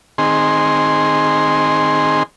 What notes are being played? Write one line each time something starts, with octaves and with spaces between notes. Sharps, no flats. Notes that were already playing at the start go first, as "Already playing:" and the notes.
D#3 C4 G#4 C6